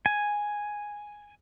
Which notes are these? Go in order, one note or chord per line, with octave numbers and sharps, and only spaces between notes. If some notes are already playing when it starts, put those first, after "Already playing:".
G#5